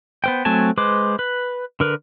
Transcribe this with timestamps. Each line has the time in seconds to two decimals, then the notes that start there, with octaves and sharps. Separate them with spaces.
0.24 B3 C5 G5
0.45 F#3 A3 C4 G#5 A5
0.78 G#3 B4 C5 D6
1.19 B4
1.80 D3 A#4 B4